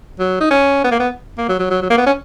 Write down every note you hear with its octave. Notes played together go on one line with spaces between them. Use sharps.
F#3
D#4
C#4
B3
A#3
B3
A#3
F#3
F#3
F#3
F#3
A#3
B3
C#4